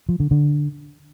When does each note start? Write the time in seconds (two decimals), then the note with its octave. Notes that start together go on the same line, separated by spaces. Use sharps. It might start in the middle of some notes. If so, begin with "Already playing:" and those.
0.09 F3
0.20 D3
0.31 D3